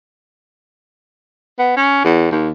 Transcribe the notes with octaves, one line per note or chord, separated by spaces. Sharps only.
B3
C#4
E2
D#2